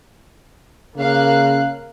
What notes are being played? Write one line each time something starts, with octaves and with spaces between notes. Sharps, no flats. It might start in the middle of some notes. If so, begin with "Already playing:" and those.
C#3 A#3 F5 F#6